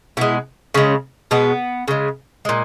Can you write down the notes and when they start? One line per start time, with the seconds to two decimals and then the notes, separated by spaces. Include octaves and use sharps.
0.17 B2 G#3 E4
0.74 C#3 G#3 C#4
1.31 B2 G#3 B3
1.88 C#3 G#3
2.45 A#2 G#3